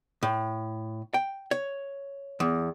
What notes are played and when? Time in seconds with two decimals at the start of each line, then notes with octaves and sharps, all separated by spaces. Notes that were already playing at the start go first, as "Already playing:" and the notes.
0.23 A2
1.14 G5
1.51 C#5
2.40 E2